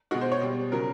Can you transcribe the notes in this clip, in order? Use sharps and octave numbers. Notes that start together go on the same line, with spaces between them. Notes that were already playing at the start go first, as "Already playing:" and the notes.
B2 G#3 F#4
C5
C#5
B2 G3
C#3 F#3 A#4